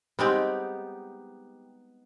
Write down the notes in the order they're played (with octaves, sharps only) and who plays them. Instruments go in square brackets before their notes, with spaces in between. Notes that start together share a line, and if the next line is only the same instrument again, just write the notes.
[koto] G3 G#3 C4 [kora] B3 D#4 G4